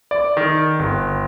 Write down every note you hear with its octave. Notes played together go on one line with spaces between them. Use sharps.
D5
D#3
G1